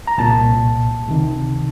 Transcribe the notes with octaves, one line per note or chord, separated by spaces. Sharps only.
A#5
C2 A#2 A5
C#2 C3 D#3